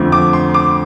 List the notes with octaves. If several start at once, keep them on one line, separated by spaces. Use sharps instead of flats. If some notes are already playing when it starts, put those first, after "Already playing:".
Already playing: F2 D3 A3 C4
D6
C6
D6